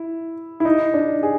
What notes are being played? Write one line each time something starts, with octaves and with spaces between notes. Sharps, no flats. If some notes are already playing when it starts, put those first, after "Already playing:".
Already playing: E4
E4
D#4
D4
G#4